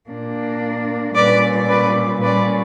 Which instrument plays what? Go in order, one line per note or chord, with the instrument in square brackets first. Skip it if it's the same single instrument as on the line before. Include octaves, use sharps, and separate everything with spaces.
[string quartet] A#2 A#3 D4
A#2 G3 C#4 B4 D5
B4 D5
A#2 G3 C#4 B4 D5